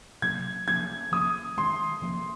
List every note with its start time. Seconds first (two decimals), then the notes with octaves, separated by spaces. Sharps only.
0.22 C3 F#3 A#3 C#4 G#6
0.67 F3 A#3 C#4 G#6
1.12 F3 A#3 C#4 D#6
1.57 D#3 G#3 C4 C6
2.02 F3 A#3 C#4